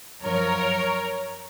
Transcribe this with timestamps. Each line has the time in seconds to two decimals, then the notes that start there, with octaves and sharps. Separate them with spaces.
0.23 F#2 F3 A#4 C#5